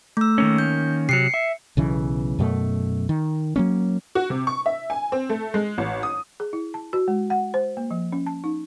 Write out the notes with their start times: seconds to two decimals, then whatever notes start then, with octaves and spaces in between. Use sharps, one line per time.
0.17 A3 E6
0.38 D#3 A#3 C#4
0.58 G6
1.09 C3 F#3 C7 C#7
1.34 E5
1.77 B1 C#3 E3
2.39 F#2 B2 A3
3.09 D#3
3.56 F#3 A#3 C#4
4.15 F#4
4.30 C3
4.47 C#6
4.66 E5
4.90 G#5
5.12 C4
5.30 A3
5.54 G#3
5.78 A1
6.03 D#6
6.40 G#4
6.53 E4
6.74 A5
6.93 F#4
7.08 G#3
7.30 F#5
7.54 C5
7.77 A#3
7.91 F3
8.12 C#4
8.26 A5
8.44 D#4